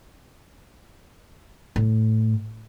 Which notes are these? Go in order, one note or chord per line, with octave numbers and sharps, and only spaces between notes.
A2